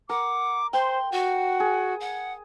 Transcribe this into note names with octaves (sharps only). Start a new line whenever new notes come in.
A#4 F#5 D6
C5 G5 C6
F#4 F#5
G#4
F#5